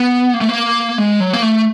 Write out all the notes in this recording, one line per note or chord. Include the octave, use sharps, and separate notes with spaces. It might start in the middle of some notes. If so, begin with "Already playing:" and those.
Already playing: B3
A#3
A3
A#3
G#3
F#3
A#3
A3